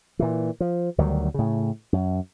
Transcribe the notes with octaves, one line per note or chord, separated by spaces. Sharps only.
A#2 E3
F3
D2 D#3 F#3 G3
A2 C#3
F#2